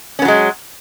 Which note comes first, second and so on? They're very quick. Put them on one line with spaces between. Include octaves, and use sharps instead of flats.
C#4 B3 F#3 G#3